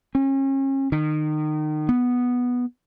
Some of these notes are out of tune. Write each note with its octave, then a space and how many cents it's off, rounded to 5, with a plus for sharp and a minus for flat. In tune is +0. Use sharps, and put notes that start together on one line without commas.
C#4 -35
D#3 -25
B3 -5